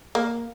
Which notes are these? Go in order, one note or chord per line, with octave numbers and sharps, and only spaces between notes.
A#3